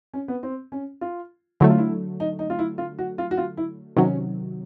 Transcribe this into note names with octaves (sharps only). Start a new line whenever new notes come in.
C#4
B3
C4
C#4
F4
D3 F#3 A3 E4
F4
E4
D#4
D#4
F4
E4
F4
F#4
F4
F#4
F4
E4
C3 D#3 F#3 C#4